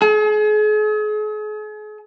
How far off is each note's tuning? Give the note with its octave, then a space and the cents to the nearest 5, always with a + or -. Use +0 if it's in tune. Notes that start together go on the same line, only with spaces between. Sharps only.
G#4 +40